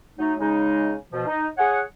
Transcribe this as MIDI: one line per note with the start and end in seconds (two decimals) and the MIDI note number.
0.18 0.33 54
0.18 0.33 57
0.18 0.33 63
0.40 0.94 49
0.40 0.94 56
0.40 0.94 63
1.13 1.24 47
1.13 1.24 53
1.27 1.46 63
1.57 1.81 68
1.57 1.81 73
1.57 1.81 78